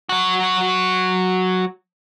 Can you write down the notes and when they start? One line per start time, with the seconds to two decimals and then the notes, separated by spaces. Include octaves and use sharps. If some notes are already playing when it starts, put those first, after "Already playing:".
0.09 F#3 F#4